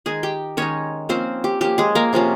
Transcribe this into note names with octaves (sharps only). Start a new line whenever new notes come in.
D#3 G#3 D#4 G#4 G#5
G4 G5
D#3 G#3 C#4 D#4 C#5
F3 A#3 C4 C#4 C5
G4
F3 A#3 C#4 G4
G#3 G#4
A#3 A#4
C3 F3 A#3 C#4